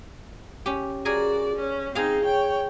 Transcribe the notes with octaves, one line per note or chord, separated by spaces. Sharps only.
C#4 G4
F#4 G#4 A#4 D5 G#5
C#4
C4 D#4 G#4 F5
C#5 G5